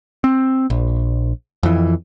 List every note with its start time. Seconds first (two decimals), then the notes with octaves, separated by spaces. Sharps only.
0.24 C4
0.70 A#1
1.63 F2 E3